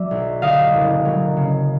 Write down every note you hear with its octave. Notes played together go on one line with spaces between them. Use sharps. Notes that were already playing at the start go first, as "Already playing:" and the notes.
Already playing: F#3 D5 E5
B1
D3 D#5 F5
F#1
F#3
C#3